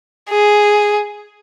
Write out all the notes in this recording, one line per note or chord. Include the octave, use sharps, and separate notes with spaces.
G#4